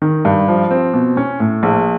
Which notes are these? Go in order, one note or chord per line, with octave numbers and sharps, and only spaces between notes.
D#3
G2
F3
C4
B2
C#4
A2
A#1